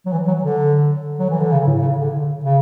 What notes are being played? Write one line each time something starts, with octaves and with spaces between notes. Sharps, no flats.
F#3
E3
F#3
D3
F#3
E3
D3
C#3
A2
C#3
D3
C#3